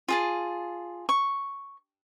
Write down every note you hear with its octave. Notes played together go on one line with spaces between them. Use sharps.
F4 G#4 A5
C#6